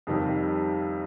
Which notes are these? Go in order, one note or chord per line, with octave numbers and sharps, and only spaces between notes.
F2 C3 D#3 G3